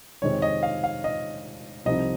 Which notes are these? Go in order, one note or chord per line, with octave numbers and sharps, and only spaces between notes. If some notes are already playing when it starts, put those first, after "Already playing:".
F2 C3 D#3 G#3 C4 C#5
D#5
F5
F5
D#5
C2 C3 F3 C4 D#4 D#5